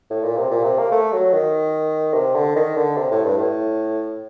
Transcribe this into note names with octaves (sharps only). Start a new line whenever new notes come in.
A2
A#2
C3
A#2
C3
A#3
A3
F#3
D#3
C3
D3
D#3
D3
C3
A2
G2
A2